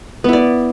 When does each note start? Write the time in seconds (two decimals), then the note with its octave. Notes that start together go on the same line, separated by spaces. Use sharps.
0.24 B3
0.29 E4
0.33 D5